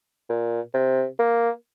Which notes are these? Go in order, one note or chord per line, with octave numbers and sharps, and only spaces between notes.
A#2
C3
A#3